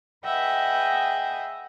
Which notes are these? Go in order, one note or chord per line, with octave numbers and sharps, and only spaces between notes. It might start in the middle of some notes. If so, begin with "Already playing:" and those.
G#4 B4 D#5 E5 F#5 G5